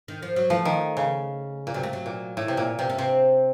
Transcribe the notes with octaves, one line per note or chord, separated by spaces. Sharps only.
D#3
F3
F#3
F3 A3
D#3
C#3
A#2
C3 F#3
A3
F#3
A#2
A2
C3
A#2
C3
C#4
C3 C4